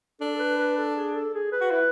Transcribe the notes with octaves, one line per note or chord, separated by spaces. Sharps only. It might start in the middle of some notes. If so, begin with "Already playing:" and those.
D4 A4
A4
B4
B4
A4
G#4
A4
G#4
B4
F#4
E4 B4